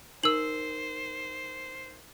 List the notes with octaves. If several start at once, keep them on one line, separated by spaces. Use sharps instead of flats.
D#4 A#4 C5 E6 F#7